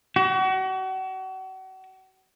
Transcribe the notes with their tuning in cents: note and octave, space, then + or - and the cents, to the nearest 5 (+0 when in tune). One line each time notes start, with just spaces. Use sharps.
F#4 +35